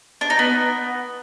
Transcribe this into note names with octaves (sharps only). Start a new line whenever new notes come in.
D4
D#4
B3